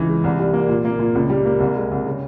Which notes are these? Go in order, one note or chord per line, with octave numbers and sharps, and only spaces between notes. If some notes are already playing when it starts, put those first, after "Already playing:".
Already playing: C#2 E3
G#3
C2
G3
A#3
A#2
A#3
A#2
C#2
G3
A#3
C2
G#3
C2
C#3